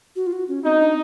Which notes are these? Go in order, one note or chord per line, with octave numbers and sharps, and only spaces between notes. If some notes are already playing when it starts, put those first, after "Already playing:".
F#4
F4
F#4
C#4
C4 D#4
D4